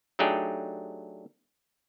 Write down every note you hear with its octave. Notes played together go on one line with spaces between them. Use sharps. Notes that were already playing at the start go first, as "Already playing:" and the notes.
F#3 A3 D4 D#4 G4 G#4